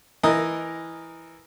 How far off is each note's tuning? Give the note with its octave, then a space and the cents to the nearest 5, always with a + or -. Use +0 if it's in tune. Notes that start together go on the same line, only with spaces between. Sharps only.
E3 +0 A#4 +0 D#5 +0